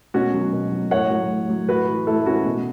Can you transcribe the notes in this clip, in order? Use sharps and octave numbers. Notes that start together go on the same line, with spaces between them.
B2 C#4 F#4
F#3
B2
F#3
A2 C#5 F#5
F#3
A2
F#3
A2 F#4 B4
E3
A2 E4 A4
E3 C#4 F#4
B2